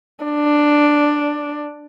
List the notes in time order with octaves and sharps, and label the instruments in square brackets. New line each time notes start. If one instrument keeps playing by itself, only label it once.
[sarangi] D4